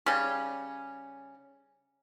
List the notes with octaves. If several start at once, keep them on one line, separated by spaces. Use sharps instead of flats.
C#3 G3 C#4